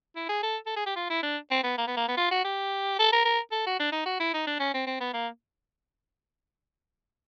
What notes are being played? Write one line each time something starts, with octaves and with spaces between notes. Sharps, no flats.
E4
G#4
A4
A4
G#4
G4
F4
E4
D4
C4
B3
A#3
B3
A#3
B3
F4
F#4
G4
A4
A#4
A#4
A4
F#4
D4
D#4
F#4
E4
D#4
D4
C#4
C4
C4
B3
A#3